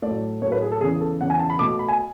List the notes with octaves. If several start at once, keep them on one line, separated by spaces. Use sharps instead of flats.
A2 F#3 A3 D5
A2 F#3 A3 C#5
B4
G#4
A4
E2 C#3 E3 G#4
A4
E2 C#3 E3 F#5
G#5
A5
B5
B2 A3 D6
B5
G#5